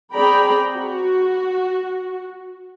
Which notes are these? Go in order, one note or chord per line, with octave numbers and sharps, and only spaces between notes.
C4 G#4 D5 G5 A#5 B5
F#4